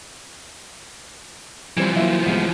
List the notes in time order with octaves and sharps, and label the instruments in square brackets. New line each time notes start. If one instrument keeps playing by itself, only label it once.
[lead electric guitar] E3 F3 [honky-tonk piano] G3 C4
[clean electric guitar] F#3 A#3 [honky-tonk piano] E4 E5 F5
[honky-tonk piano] C2 [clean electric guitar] G#3 B3